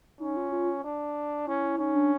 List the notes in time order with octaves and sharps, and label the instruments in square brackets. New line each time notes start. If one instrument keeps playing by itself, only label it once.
[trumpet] C#4 [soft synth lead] D#4
[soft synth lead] F4
F4
[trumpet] D4
[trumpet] C#4 [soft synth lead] E4
[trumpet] C#4 [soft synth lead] D#4
[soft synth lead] D4